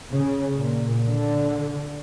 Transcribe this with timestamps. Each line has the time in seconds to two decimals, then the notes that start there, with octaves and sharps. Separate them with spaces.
0.14 C#3
0.55 A#2
1.08 D3